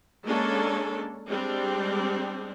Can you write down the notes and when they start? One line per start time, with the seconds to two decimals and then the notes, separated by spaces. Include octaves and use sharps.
0.25 G#3 A#3 C#4 D4 A4
1.28 G3 G#3 C4 D4